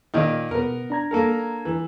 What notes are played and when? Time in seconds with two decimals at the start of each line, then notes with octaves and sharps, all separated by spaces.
0.14 A#2 D#3 D#4
0.51 B2 B3 A#4
0.90 D4 A#5 G#6
1.11 A#3 A4 A#4
1.65 E3